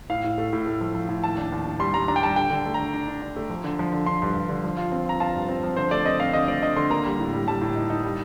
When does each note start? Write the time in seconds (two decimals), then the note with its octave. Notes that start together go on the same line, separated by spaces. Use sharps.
0.10 A2 F5
0.24 A2
0.38 A3
0.53 A2
0.66 A3
0.81 F3
0.95 F3
1.09 A2
1.24 D#2 A5
1.38 D4
1.52 D#2
1.65 D4
1.79 G3 C6
1.94 G3 A#5
2.08 D4 A#5
2.16 G5
2.22 G3 A5
2.36 D3 G5
2.51 D3
2.66 A3
2.74 A#5
2.80 D3
2.94 D4
3.08 D4
3.22 D4
3.36 A3
3.50 F3
3.64 D3
3.79 F3
3.92 D3
4.06 D3 C6
4.22 G2
4.35 G2
4.49 D3
4.64 F3
4.77 F4
4.92 C4
5.06 F4 A#5
5.20 F4 A5
5.35 G2
5.49 C4
5.64 F3
5.77 D3 C5
5.91 A3 D5
6.05 C4 D#5
6.20 C4 F5
6.33 D3 D#5
6.48 A3 D5
6.62 D3 D#5
6.77 D3 C6
6.90 A#3 A#5
7.05 G3
7.19 A2
7.33 G3
7.47 G3 A5
7.61 A2
7.75 D#4
7.90 D#4
8.04 G3